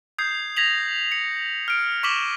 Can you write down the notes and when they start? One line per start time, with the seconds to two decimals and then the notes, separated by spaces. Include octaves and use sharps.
0.19 D#6 G6 G#6 C7
0.56 G#6 A#6 B6 F7 F#7
1.12 C#7
1.68 F6 D7
2.03 C#6 D6 B6 E7 F#7 G7